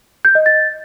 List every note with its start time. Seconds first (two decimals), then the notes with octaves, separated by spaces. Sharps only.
0.25 G6
0.35 D#5
0.46 A6